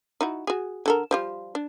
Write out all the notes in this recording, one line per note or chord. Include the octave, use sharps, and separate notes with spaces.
D#4 E4 F#4
F#4 G#4
D3 A4 A#4
F3 G3 F4
D4